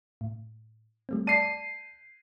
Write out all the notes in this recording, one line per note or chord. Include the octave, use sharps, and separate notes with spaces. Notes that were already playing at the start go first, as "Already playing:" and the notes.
A2
G3 A3 C4
D5 A5 C7 D#7